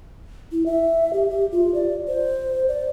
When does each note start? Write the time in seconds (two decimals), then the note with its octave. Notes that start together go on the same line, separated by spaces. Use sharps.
0.52 E4
0.66 E5
1.13 G4
1.30 G4
1.52 F4
1.74 D5
2.08 C5
2.68 D5